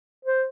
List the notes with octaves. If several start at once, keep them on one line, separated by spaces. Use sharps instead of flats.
C5